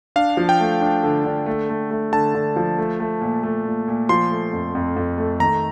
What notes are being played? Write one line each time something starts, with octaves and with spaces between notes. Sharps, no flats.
D4 F5
F3
G5
A3
D4
D3
D3
A3
A3
A3
D3 A5
D3
F3
A3
A3
A#2
A3
A#2
A#2
F3 C6
A3
F2
F2
F2
A3
D#3 A#5